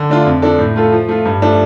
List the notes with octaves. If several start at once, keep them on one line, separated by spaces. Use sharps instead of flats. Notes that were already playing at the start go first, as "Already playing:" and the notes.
Already playing: D3
A3 D4 F4
F2
F3 D4 A4
A2
A3 F4 A4
F3
A3 F4
G2
F3 A3 D4